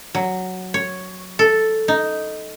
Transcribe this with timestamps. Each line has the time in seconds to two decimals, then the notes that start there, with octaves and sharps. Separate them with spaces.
0.15 F#3
0.74 C#5
1.39 A4
1.88 D#4